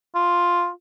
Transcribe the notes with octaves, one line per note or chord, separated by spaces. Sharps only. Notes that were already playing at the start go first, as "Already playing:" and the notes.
F4